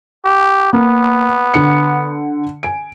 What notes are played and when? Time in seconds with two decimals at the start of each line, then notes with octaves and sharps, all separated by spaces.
0.25 G4
0.73 A#3 B3
1.54 D3 F#5 C#7
2.63 G#5 D7